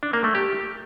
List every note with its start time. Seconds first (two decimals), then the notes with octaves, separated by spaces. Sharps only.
0.03 D4
0.13 A#3
0.24 A3
0.35 G4